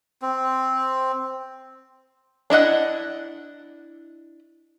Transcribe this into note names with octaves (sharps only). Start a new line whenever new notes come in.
C4
D4 E4 D#5 F#5